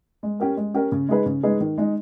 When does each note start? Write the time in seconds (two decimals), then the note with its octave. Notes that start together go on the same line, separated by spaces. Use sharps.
0.23 G#3
0.40 C#4 G4 A#4
0.57 G#3
0.74 C#4 G4 A#4
0.92 C#3
1.09 G#3 D#4 G#4 B4
1.26 C#3
1.43 G#3 D#4 G#4 B4
1.61 D#3
1.78 G#3 D#4